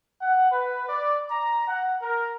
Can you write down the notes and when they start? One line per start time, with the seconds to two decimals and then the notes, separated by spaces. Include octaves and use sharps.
0.20 F#5
0.50 B4
0.88 D5
1.30 A#5
1.68 F#5
2.01 A#4